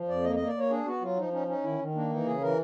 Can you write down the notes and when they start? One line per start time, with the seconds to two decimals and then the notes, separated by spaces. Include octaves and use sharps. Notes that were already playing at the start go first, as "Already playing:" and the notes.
Already playing: F3
0.08 F2 D5
0.24 A#3 D#5
0.36 A#3 D#5
0.47 D5
0.55 A#3 C#5
0.70 D4 G#4
0.85 B3 F#4
1.01 F#3 F4
1.17 F3 D#4
1.32 C#4 D#4
1.48 C#4 D#4
1.64 D#3 E4
1.79 D#3
1.95 A#3 D4
2.10 E3 D#4
2.26 C#3 G#4
2.41 E3 A#4